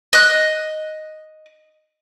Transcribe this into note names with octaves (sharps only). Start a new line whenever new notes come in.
D#5 F#6